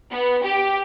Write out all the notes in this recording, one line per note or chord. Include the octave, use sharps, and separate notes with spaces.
B3
G4